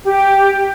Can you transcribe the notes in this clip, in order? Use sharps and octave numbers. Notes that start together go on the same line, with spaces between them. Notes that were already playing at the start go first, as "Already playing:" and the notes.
G4